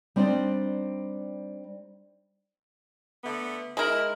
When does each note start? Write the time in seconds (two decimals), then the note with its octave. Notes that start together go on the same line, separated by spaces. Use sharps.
0.16 G3 C4 D4 D#4 D5
3.24 D3 A3 B3
3.77 G#3 E4 A#4